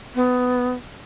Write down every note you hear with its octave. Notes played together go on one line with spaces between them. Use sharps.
B3